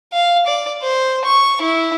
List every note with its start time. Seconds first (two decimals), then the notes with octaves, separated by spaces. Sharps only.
0.13 F5
0.47 D5
0.82 C5
1.25 C#6
1.61 E4